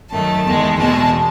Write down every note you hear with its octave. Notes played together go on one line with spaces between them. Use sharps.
F#2 D#3 A3 A5
E2 D#3 G#3
E2 B2 G#3 A5